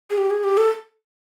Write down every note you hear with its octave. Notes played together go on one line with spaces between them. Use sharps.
G#4
G4
G#4
G4
A4